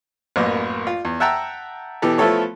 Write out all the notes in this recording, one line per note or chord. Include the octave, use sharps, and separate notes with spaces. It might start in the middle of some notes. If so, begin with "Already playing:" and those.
A1 F#2 A#3 B3
F4
E2
E5 F#5 G5 A5 A#5 E6
B2 E3 G4 A4
F3 A3 B3 E4 A4 C#5